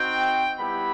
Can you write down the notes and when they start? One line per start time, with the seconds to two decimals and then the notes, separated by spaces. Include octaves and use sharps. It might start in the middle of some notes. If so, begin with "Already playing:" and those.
Already playing: C4 D#4 F#4 G5
0.59 G3 B3 E4 G4 B5